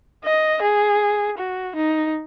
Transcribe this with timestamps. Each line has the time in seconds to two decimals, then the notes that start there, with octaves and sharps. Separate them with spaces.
0.24 D#5
0.62 G#4
1.38 F#4
1.76 D#4